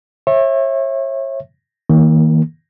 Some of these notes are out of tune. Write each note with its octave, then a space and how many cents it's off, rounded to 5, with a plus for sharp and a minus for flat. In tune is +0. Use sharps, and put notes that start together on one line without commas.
C#5 -35 E5 +0
D#3 +40 A#3 +0